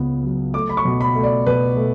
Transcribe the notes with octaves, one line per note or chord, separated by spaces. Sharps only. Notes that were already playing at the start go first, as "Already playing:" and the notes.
Already playing: C#2 C#3 B3
F#3
A3 D6
B5
C#6
B2
B5
A3
D5
B2 B4
A3